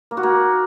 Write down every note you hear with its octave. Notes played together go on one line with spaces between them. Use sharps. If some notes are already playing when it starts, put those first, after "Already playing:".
A#3
F#4
A#3